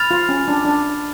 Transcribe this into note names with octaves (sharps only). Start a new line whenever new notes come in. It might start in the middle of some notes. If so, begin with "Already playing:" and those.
Already playing: B5 F6 A6 F7
F4
C#4
D4
D4